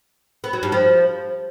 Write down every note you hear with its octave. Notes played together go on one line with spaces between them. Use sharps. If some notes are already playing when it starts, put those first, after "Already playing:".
B3
F#3
G2
F3